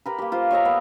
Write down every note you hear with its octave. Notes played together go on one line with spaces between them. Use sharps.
G4 A#4 B4
A#3 G4
F4 C5
C#5 D#5 E5 A#5
B3